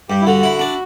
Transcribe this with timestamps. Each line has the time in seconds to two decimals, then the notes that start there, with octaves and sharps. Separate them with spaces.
0.09 G2 G4
0.21 E4
0.26 D3 F#4
0.43 E4
0.59 D4